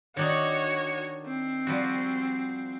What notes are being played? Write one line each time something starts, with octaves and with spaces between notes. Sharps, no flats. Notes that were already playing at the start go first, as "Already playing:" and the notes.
D#3 D4 D#4 F#4 C#5
C4
F3 G3 F#4